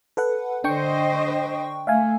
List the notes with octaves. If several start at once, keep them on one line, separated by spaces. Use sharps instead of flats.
A4 B4 F#5
D3 D4 C5 D#5 G5 C#6
A3 E5 F5 G#5